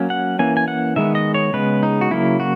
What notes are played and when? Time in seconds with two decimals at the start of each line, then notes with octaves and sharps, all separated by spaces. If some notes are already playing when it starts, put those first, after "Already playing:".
Already playing: F#3 A#3 C#4
0.10 F#5
0.39 E3 A#3 C#4 G#5
0.57 G#5
0.68 F#5
0.96 D#3 G#3 B3 E5
1.15 D#5
1.34 C#5
1.53 C#3 G#3 B3 B4
1.83 D#4
2.01 F#4
2.11 C#3 F#3 A#3 E4
2.40 F#4